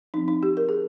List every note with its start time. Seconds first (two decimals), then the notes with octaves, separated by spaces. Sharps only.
0.14 F3 C4 D#4
0.28 D#4
0.43 G4
0.57 A#4
0.69 G#4